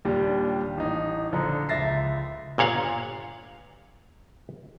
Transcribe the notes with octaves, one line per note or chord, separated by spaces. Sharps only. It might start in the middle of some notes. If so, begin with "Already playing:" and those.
D#2 A#2 G3 D4
A1 D#4
A#1 D3 F3 A#5
C#2 E5 A6 A#6 C7
G1 A#2 C#5 F5 F#5